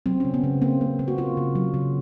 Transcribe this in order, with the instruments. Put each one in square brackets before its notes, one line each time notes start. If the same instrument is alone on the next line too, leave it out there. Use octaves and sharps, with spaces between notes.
[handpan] F#3 C4
C#4
C#3
B3
C#3
A#3 C4
A#3
A#3
F#4
A#3 F4
C#3
F#3
C#3